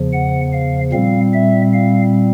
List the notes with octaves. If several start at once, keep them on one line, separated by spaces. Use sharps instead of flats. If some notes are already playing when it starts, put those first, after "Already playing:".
Already playing: E2 C#3 F3
F#5
F5
A#2 G3 C4 F5
E5
F5